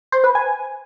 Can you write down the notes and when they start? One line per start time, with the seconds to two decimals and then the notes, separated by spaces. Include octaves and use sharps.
0.12 C5
0.24 B4
0.35 G#5